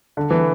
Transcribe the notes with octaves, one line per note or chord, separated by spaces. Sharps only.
D3
E3